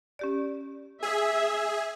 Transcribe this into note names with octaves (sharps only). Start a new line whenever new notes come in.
C#4 G4 D5
G#4 E5